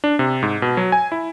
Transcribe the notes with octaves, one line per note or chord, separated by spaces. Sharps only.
D4
C3
G#2
B2
F#3
G#5
E4